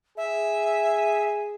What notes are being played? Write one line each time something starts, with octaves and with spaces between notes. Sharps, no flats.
G#4 E5